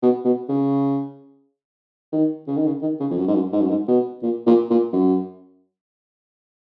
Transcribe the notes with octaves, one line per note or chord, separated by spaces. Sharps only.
B2
B2
C#3
D#3
C#3
D#3
C#3
D#3
C#3
F2
F#2
G#2
F#2
G#2
F#2
G#2
B2
A#2
A#2
A#2
F#2